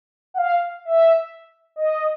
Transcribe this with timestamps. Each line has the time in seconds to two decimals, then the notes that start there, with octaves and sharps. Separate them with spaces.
0.34 F#5
0.38 F5
0.85 E5
1.76 D#5